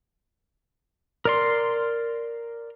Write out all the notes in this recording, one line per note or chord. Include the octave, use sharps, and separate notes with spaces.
A#4 D5 C6